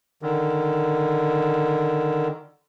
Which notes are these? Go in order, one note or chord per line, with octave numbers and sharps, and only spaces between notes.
D3 D#3